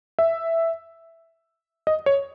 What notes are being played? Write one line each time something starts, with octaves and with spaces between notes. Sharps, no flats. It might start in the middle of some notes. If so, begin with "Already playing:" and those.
E5
D#5
C#5